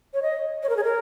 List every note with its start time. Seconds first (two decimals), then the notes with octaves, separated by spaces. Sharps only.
0.14 C#5
0.22 D#5
0.63 C#5
0.69 A#4
0.77 G#4
0.84 A#4